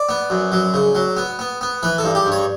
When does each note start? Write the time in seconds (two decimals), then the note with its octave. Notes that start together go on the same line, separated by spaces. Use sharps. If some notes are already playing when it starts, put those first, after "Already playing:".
Already playing: D5
0.09 B3
0.30 F#2
0.52 F#3
0.74 C#3
0.95 F#3
1.17 B3
1.39 B3
1.61 B3
1.83 E3 B4
1.98 A4
2.04 G2
2.15 G4
2.26 G2
2.32 C#5